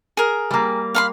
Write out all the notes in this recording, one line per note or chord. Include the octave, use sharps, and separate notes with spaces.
G#4 A#4
G3 A#3
F5 B5 C6